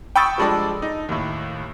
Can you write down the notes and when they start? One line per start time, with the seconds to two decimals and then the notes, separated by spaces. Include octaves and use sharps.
0.16 G5 B5 C#6 D#6 E6 A6
0.38 F3 G3 G#3 D4 A4 D5
0.82 D#4
1.09 D#2 A2